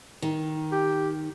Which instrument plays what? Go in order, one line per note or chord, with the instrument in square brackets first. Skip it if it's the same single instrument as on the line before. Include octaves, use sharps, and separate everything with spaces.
[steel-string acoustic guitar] D#3
[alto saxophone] G4